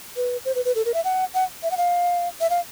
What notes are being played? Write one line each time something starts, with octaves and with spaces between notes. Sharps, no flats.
B4
C5
B4
B4
A4
A#4
E5
F#5
F#5
E5
F#5
F5
E5
F5